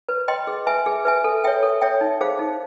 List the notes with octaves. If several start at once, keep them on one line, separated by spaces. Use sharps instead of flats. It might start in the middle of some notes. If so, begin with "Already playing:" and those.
B4
D#5 G5 C6
G#4
B4 E5 G#5
G#4
B4 E5 G#5
A4
C#5 E5 G5
A4
C#5 E5 G5
D#4
G#4 C5 F5
D#4